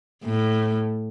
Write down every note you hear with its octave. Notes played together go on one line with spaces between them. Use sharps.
A2